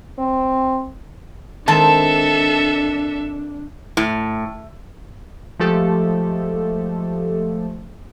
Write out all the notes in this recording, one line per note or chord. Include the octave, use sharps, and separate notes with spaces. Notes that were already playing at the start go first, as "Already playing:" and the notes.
C4
D#3 G#3 C4 D4 A4 E5 A5
A2
F3 G#3 A3 G4 A4